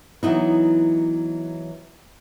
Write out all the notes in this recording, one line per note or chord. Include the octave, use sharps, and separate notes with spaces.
E3 F#3 B3 D#4 E4